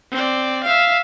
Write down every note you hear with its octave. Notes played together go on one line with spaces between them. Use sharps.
C4 D5
E5 F5